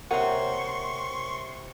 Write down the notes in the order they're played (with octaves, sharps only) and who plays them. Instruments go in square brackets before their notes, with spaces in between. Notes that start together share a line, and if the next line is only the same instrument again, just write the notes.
[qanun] C3 A#3 [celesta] A#4 C5 C#5 [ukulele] F#5 [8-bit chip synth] C6 C#6